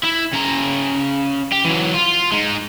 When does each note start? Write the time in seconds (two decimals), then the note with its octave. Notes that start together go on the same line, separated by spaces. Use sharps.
0.05 E4
0.34 C#3 A#5
1.52 G4
1.64 E3 F#3
1.94 F4
2.32 G#3 D#4